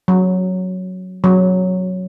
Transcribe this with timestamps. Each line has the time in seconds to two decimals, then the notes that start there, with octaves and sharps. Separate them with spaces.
0.08 F#3
1.24 F#3